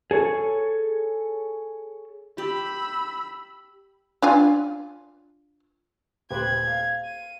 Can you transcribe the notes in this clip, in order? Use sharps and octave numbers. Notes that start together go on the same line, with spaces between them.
G#4 A4 C#5
G4 B5 E6
D4 F4 G#5
D#1 G4 B4 C5 G#6
F5
D#7